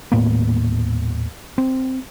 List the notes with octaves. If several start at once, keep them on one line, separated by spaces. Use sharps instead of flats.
D#1 A2 A#3 B3
C4